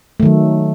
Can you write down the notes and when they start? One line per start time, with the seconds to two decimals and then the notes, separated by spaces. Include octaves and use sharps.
0.20 A3
0.23 D#3
0.25 F#3